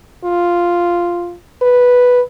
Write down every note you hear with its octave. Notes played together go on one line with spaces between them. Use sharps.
F4
B4